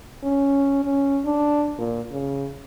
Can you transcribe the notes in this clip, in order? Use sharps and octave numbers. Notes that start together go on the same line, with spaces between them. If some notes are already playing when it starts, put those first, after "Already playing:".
C#4
C#4
D4
A#2
C#3